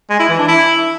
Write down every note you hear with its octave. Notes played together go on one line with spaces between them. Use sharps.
G#3
E4
E3
D4
E4